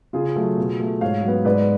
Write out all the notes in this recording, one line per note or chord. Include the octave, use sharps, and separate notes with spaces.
C#3 F4 G#4
F#3 A3
B2
A3
G#2 C#5 F5
F#3 B3
G#2 B4 D5